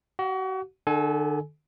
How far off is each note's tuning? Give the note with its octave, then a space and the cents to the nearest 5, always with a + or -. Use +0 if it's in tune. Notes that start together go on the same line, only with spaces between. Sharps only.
F#4 +35 F#5 -35
D3 +40 A4 -25 G#5 +15